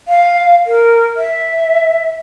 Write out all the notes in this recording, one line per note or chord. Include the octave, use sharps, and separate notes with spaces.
F5
A#4
E5